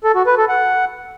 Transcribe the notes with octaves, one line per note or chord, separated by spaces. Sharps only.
A4
F#4
B4
A4
F#5